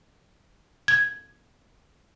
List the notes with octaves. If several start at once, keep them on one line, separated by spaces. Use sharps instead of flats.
G#6